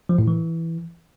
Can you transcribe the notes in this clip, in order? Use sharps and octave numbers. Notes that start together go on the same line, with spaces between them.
F3
A2
E3